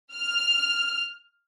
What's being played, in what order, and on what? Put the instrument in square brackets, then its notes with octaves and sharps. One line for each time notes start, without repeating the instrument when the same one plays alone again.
[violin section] F6